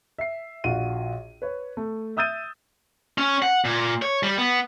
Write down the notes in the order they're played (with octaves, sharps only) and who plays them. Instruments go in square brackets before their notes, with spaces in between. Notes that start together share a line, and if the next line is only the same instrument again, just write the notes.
[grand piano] E5 C7
A#1 F4 F#4 D#7
B4 C#5
A3
E5 D#6 E6 G6 A6 D#7
[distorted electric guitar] C#4
F#5
A#2
C#5
G3
B3